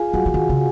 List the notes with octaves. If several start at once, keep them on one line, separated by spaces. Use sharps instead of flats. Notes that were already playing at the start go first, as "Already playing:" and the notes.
Already playing: F4 G#4 F5 G#5
F#3 F#4 F#5
F3
D#3
C#3